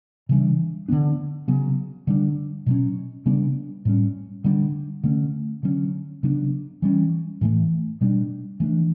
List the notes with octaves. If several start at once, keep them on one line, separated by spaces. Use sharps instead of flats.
C#3 E3 G3 D4
D3 F#3 B3 D4
C#3 F#3 B3
D3 G3 D4
B2 F#3 C#4
C#3 G3 B3 D4
A2 G3 C#4
D3 G3 B3 D4
D3 A3 C#4
D3 F#3 C#4
C#3 F#3 B3 D4
E3 G3 C#4
A2 E3 A3
B2 G3 B3 D4
E3 A3 D4